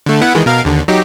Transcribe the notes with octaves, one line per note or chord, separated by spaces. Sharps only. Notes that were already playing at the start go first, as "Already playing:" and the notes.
D3 A3
B3 E4 F#5
D#3 E3 G#3
B2 A#4 F5
D#2 D3
F#3 D#4 G4